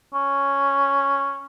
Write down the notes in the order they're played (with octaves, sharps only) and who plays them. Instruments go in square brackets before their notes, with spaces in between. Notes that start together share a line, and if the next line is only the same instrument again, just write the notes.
[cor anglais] C#4